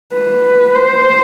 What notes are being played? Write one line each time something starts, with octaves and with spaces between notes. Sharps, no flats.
B4
C5